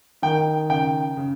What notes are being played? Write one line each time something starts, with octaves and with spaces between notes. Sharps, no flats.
D#3 G5
C#3 G5
C#3